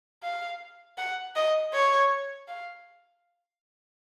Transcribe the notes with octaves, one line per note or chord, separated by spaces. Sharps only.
F5
F#5
D#5
C#5
F5